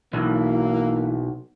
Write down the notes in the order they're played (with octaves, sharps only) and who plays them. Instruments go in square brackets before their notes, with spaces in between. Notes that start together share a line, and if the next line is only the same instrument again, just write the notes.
[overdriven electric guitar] B1 [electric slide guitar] E3 [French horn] A#3